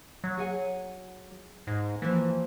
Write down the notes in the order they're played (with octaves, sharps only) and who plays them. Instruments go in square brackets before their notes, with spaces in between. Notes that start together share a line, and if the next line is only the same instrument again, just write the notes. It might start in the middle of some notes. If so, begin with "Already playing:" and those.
[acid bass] F#3
[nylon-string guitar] G#4 F#5 G#5
[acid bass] G#2
[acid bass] E3 [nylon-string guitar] F3 A#3